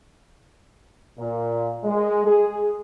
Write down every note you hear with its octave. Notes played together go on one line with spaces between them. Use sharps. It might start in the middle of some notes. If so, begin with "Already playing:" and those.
A#2
G#3
G#4